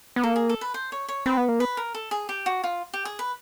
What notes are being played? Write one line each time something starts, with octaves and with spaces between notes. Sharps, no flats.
B3
A#3 A4
G#4
A4
B4
C5
C#5
C#5
C4 B4
B3
A#3
B3 B4
A#4
A4
G#4
G4
F#4
F4
G4
G#4
B4